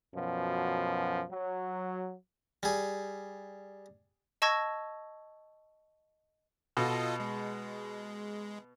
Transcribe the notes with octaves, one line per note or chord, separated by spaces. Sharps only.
F#2 B2 F3
F#3
G3 G#4
D#5 A5 C#6 E6 G#6 A#6
B2 F4 A4 D#5
G#3